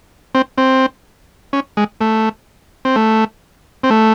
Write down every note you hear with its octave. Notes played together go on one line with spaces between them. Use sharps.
C4
C4
C#4
G#3
A3
C4
A3
C4
A3